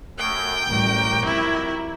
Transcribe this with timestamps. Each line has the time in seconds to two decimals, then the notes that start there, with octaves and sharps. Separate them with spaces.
0.19 F#2 A3 G5
0.69 A1 F#3 G3 F#4 G4 A#4
1.25 F2 E4